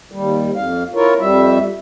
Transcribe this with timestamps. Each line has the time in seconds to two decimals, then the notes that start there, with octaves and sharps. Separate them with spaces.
0.12 D#2 G3
0.56 F2 F5
0.95 E4 F4 A#4 C#5
1.20 F2 G3 E5